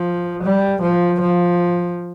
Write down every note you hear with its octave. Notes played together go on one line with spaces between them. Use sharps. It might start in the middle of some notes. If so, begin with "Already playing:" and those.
Already playing: F3
G3
F3
F3